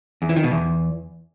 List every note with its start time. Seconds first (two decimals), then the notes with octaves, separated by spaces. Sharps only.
0.22 E2
0.29 E3
0.36 D#3
0.44 B2
0.51 E2